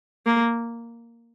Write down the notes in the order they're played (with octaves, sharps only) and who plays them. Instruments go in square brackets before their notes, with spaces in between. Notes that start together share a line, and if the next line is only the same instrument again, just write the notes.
[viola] A#3